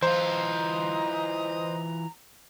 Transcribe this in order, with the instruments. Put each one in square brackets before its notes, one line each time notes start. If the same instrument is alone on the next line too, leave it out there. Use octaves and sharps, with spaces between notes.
[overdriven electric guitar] E3 F4 [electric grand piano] C5 [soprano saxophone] D#5 [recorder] A#5